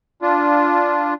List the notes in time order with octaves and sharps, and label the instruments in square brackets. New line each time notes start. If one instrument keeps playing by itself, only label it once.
[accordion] D4 F4